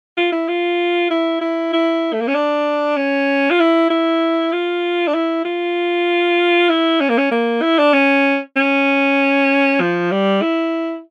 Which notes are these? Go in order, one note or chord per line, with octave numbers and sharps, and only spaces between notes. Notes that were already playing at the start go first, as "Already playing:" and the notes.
F4
E4
F4
E4
E4
E4
A3
A#3
C#4
D4
C#4
F4
E4
E4
F4
D4
E4
F4
E4
C#4
A#3
C#4
A#3
E4
D4
C#4
C#4
F3
G3
E4